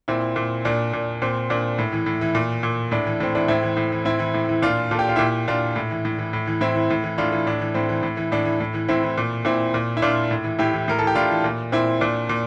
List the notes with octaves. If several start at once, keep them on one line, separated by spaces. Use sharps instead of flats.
A#2 C4 E4
A#2
A#2 D4
A#2
A#2 C4
A#2 D4
A2
E3
A2
E3
A#2
A#2
A2 D4
E3
A2 C4
E3 D4
A2 C4 E4
E3
A2
E3
A2 C4 E4
E3
A2
E3
A#2 D4 F4
A#2 A4
G4
F4
A#2 E4 G4
A#2 D4 F4
A2
E3
A2
E3
A2
E3
A2 C4 E4
E3
A2
E3
A2 D4 F4
E3
A2 D4
E3
A2 C4
E3
A2
E3
A2 D4
E3
A2
E3
A2 C4 E4
E3
A#2
A#2 C4 E4
A#2
E4
A#2 D4 F4
A2
E3
A2 E4 G4
E3
A2 A#4
E3 A4
G4
A2 D4 F4
E3
A#2
A#2 C4 E4
A#2 D4
A#2